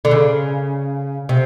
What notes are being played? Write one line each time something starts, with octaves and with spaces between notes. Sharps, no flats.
D3
C#3
C3